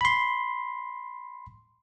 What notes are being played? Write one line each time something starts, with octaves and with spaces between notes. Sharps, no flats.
B5 C6